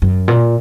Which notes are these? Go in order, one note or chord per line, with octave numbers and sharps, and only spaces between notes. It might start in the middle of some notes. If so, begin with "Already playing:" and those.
F#2
A#2